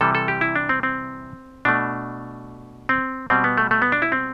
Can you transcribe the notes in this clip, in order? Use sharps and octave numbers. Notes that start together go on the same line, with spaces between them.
C3 E3 G3 A4
A4
G4
E4
D4
C4
C4
B2 A3 D4
C4
B2 G3 C4
B3
A3
A3
B3
D4
E4
C4